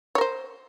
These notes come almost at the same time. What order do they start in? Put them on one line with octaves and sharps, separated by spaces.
C#5 A#4 C5